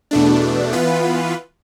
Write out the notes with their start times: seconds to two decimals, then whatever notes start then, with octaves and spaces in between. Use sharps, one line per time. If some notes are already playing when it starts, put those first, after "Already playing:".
0.11 E2 B2 A3 D4
0.73 E3 B3 F4 B4